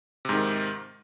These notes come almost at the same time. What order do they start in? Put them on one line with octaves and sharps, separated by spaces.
C3 G#2 D#3